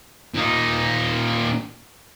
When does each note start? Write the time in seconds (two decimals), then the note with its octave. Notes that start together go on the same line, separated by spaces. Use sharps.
0.34 A#2 D#4